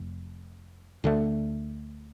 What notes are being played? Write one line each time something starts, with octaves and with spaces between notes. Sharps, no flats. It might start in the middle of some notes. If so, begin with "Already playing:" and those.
Already playing: F1 F2
D2 D3 A3